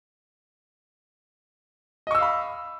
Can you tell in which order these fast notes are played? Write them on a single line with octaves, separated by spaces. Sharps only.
D#5 C#6 E6 F5 B5